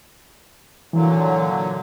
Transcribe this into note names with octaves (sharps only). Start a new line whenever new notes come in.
A#2 D3 E3 F#3